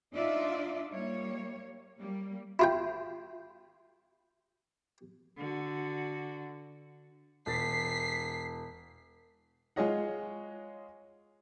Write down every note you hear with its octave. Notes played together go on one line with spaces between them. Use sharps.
D4 D#4 F4 D5 E5
G3 A#3 C#5
G3 A#3
E4 F4 G5
D3 F#4
E1 A6 B6 C7
G#3 F4 G#4 C#5 D#5 F#5